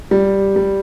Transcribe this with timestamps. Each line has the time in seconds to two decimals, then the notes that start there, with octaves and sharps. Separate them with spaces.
0.11 G3
0.56 G3